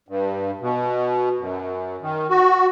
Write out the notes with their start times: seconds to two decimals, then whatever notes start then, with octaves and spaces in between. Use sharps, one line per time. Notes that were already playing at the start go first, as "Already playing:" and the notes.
0.09 G2
0.61 B2
1.38 F#2
2.02 D#3
2.30 F#4